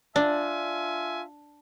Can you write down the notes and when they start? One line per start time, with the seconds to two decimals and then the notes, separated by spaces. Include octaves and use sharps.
0.16 D4 F4 E5 G#5